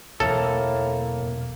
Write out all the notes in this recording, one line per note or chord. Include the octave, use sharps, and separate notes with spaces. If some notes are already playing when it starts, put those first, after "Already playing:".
B1 E2 A2 E3 A#3 A4